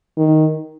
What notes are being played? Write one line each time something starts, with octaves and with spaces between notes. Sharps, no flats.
D#3